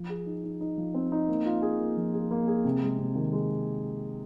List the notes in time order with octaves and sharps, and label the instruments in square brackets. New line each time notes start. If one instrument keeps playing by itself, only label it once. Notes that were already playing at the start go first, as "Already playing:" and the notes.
Already playing: [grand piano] F3
G#4
D#4
D#4
D#4
F3
C4
D#4
A#3
F4
G#4
A#3
F3
G#4
A#3
G#4
C3
G#3
C3
D#3
G#3